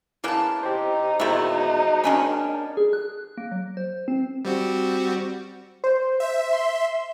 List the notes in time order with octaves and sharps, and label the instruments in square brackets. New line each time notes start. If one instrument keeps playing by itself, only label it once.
[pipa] C#3 A#3 B3 [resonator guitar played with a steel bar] E4 A5
[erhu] D#4 [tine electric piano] G4 C5
[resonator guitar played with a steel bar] A#2 B3 D5 [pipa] D#3 E4 [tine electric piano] G#3 F#4 C5
[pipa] D#3 G#4 B5 [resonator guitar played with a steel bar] A#3 C#4 D4
[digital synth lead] G#4
F#6
A#3
F#3
C5
C4
[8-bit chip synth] G3 C4 F#4
[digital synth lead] C5
[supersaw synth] E5
[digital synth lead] C6